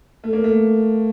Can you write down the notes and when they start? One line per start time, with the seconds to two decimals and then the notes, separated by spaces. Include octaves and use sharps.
0.24 A3
0.33 A#3
0.44 A3